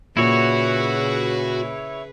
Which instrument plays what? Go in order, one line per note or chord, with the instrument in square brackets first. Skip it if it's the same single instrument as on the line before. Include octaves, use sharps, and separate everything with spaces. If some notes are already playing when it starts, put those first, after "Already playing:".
[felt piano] A#2 [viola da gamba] C#3 G#4 B4 [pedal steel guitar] E4 C#5 [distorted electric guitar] F#4